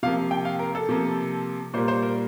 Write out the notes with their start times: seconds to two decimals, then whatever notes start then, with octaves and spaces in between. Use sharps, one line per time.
0.03 C3 F3 A#3 F5
0.31 G5
0.45 F5
0.59 A#4
0.75 A4
0.89 C3 F3 A#3
1.74 A#2 G3 A#3 C5
1.88 C5
2.03 A#4